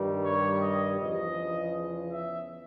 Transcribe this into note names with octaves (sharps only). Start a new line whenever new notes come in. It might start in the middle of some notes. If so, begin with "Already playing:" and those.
Already playing: G2 D#3 G3
C#5
D#5
E2 C#3 F3 D#5
E5